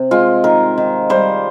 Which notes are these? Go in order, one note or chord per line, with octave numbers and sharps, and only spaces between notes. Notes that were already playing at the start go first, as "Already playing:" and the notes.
Already playing: C3
G#3 F4
D#3 A#4
D#3
G3 C5